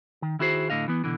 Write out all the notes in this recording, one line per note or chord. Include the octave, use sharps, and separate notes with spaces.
D#3
D#3 E4 F#4 G#4 C5
A2 D3 D#5 F5
E3 B3
B2 D3 E3